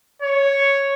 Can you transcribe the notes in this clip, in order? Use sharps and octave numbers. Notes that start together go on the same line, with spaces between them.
C#5